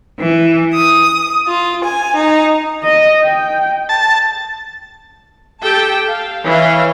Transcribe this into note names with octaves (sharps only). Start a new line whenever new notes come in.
E3
D#6
F4
G#5
D#4
D#5
G5
A5
G4 A4 G5 A5
F5
E3 C#5 F5